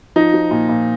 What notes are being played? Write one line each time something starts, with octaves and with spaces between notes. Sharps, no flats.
F3 D#4
F3
A#2
A#2